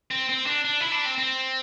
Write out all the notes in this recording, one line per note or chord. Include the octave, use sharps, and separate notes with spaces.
C4
C4
D4
D4
E4
D4
C4
C4